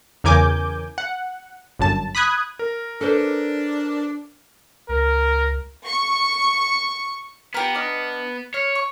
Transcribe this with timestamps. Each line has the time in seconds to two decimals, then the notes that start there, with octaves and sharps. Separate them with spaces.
0.24 E2 C#3 A#4 G#5 D6 G6
0.98 F#5
1.79 G1 F#2 A5
2.15 B5 D#6 F#6 G#6
2.59 A#4
3.01 D4 A4 B4 C5
4.89 C#2 A#4
5.85 C#6
7.54 B3 F4 G4 A#4
7.75 D4 D#5 F6
8.54 C#5 F6
8.75 C#6